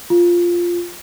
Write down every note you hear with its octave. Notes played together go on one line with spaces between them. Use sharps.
F4